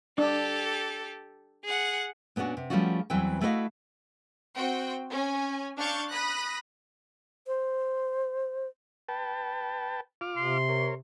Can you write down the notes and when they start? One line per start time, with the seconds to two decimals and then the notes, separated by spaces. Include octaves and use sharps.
0.18 D4 G4 A4
1.64 G#4 F#5
2.36 A#2 B3 C#4 D4 F#4
2.57 C3
2.70 F3 G3 A3 C#4 F4 F#4
3.10 E2 E3 F#3 G3 C4 G5
3.41 A3 E4 F#4 C5 D#5 F5
4.57 C4 F#4 G5
5.09 C#4 G#5
5.77 D4 F5 C#6 F6 G6 A6
6.11 B5 D#6 F#6 A#6
7.47 C5
9.08 B4 G5 A5
10.21 F4 D6 F6
10.37 C3 C6
10.69 A#4 C#5